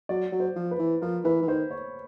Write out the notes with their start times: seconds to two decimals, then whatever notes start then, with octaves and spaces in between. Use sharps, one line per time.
0.09 F#3 D5
0.32 F#3
0.40 C5
0.56 F3
0.71 B4
0.79 E3
1.02 F3 A#4
1.24 E3 B4
1.42 E3
1.48 D#3 C5
1.71 C#5